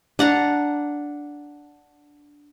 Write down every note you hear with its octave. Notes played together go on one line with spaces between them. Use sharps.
D4 F#5 A#5